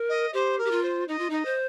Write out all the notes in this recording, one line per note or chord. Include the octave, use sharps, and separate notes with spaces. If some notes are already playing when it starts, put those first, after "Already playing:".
Already playing: A#4
D#5
G4 C5
A#4
G4
F4
C5
D#4 D#5
F4
D#4 D#5
C5